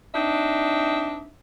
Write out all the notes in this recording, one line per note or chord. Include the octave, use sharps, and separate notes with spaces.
C4 D4 D#4 E5